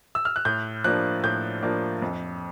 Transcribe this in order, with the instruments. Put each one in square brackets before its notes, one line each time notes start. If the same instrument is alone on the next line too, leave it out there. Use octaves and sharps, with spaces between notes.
[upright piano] E6
F6
F#6
A2 G6
F3 A#3 D4 F#6
A2 G6
F3 A#3 D4
F2